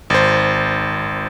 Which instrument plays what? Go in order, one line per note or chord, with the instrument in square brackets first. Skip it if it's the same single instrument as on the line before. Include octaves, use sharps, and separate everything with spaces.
[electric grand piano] G#1 C5